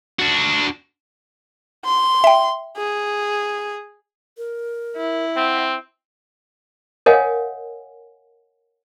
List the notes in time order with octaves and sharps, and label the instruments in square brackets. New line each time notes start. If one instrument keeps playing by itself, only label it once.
[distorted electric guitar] D4 F#4
[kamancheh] C6
[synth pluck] E5 G5
[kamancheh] G#4
[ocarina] A#4
[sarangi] E4
[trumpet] C4 [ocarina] F#5
[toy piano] A#4 C#5 D#5 F5 F#5 G#5